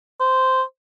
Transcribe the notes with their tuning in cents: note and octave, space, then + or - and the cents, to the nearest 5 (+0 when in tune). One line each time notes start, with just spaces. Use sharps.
C5 -10